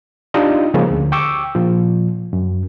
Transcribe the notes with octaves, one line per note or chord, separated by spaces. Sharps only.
D4 D#4 F4 G4 D#5
C#3 F3 G#3 A#3
D2
G5 C#6 D6 E6
A#2 F3
F#2